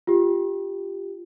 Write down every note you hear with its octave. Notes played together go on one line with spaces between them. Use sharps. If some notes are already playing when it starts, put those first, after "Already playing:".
F4 G4